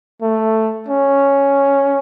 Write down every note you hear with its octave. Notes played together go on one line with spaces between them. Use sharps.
A3
C#4